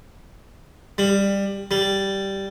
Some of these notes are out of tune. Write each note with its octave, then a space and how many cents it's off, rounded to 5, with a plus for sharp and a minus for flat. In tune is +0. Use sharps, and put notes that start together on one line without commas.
G3 +15
G3 -5